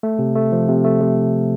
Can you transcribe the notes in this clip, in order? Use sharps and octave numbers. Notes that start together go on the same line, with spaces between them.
A3
C3
A3
F3
C3
A3
C3